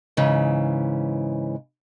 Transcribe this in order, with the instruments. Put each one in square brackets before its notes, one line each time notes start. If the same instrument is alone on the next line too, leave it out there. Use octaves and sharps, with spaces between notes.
[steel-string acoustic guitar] G#2 C#3 E3